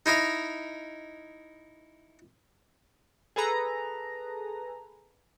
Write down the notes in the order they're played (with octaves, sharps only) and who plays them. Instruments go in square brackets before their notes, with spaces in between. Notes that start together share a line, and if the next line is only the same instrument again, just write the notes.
[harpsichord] D#4 E4 D#5 F5
[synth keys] G#4 A4 B4 A#5